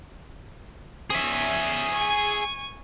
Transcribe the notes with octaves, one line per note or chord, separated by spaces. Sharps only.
C#4 G#4 E5
G#5 C#6